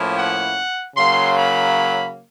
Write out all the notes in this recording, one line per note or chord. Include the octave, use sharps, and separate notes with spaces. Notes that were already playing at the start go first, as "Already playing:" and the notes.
Already playing: A2 F3 A#3 C#4 E4
F#5
C#3 F#3 A#3 C6
B5